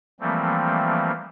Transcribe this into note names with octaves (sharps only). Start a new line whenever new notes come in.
E3 F3 G3 A3 A#3 C4